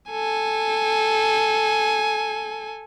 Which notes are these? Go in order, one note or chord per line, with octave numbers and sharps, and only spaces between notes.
A4 G#5